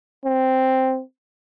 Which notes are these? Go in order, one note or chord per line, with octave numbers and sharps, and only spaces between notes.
C4